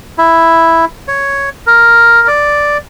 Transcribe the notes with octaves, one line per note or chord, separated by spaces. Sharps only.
E4
C#5
A#4
D5